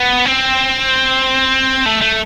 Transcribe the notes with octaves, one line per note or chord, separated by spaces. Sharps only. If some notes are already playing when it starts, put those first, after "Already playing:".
Already playing: B3
C4
A3
A3